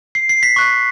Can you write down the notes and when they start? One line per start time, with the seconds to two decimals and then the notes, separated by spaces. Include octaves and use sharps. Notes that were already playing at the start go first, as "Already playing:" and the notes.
0.15 C7
0.29 C7
0.43 B6
0.56 C#6 F#6